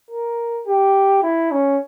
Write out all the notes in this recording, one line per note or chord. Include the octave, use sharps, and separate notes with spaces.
A#4
G4
E4
C#4